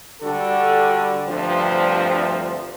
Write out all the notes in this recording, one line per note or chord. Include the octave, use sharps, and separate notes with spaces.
D3 G3 D4 F#4 A4
D2 G2 C3 F3